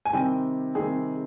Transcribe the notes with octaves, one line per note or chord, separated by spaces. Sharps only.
G#5
C3 D#3 G3 C4 G5
C3 D#3 G3 C4 G#4